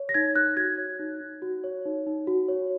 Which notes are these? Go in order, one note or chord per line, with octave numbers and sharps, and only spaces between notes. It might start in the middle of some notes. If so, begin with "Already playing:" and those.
Already playing: C#5
A#6
D#4 G#6
D#4 F#6
F#4 G#6
C#5
D#4
D#4
F#4
C#5
D#4
D#4
F#4
C#5